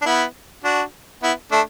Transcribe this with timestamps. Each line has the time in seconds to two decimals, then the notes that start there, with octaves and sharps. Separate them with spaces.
0.02 D4
0.06 B3 E4
0.64 D4 F#4
1.23 B3 E4
1.52 A3 D4